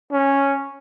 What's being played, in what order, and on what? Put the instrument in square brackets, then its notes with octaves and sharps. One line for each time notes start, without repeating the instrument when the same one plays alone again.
[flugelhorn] C#4